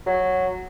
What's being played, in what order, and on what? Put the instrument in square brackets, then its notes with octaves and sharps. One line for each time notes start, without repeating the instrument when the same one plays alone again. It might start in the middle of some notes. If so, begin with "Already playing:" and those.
[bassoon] F#3